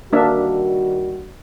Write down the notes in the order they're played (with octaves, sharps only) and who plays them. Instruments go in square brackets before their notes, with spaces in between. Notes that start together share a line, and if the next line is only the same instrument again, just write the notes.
[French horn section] D#3 G3 F#4 [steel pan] A#3 D4 E5